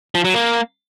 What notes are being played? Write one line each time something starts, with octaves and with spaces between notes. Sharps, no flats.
F3
F#3
A#3